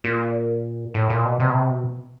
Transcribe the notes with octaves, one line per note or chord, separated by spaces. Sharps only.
A#2
A2
A#2
B2
C3
B2
C3
B2